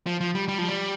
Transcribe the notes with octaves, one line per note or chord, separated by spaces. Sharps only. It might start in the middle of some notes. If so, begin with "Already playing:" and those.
F3
F3
G3
G3
F3
G3